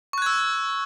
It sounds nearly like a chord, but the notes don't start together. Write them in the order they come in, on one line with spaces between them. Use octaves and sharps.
C#6 F#6 G#6 E6